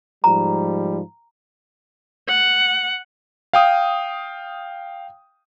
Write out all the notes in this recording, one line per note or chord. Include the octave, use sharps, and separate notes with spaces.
G#2 F3 G3 A#5
F#5
F5 G5 D#6